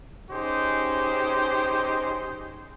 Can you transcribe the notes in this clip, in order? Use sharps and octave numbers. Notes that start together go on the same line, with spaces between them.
C#4 D#4 G4 G#4 C5